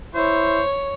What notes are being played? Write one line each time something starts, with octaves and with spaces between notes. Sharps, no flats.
E4 C5 C#5